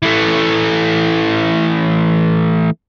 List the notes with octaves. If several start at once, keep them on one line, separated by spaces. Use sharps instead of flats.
E3 A3